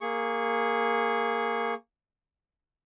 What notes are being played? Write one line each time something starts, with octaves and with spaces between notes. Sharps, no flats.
A#3 G#4 C#6